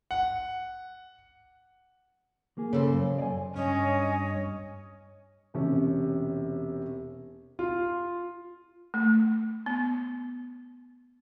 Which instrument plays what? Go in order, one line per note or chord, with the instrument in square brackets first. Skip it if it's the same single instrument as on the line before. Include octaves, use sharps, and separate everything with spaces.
[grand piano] F#5
[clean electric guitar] A#3 G#4
[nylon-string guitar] C#3 A4 C5
[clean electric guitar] F#2
D5 G#5
[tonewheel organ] G2 [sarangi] C#4 [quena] C#5 [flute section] D#5 G#5 D#6
[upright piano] E1 C3 C#4
[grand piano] F4
[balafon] A3
B3